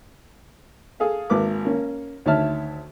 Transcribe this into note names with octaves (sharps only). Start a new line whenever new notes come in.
G#4 A4 F5
G#1 A#3 B4 D6
A#3 C#4
D2 D#3 C#5 E5 A5 F6